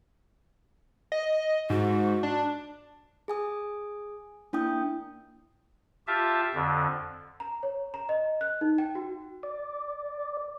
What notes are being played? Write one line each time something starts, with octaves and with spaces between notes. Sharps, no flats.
D#5
G#2 F#4
D4
G#4 G#5 D#6
A#3 D4 E4 G5 D#6 G6
F4 G4 E5 A5
F2 D3
A#5
C#5
A#5
D#5
F#6
D#4
G5
F#4
D5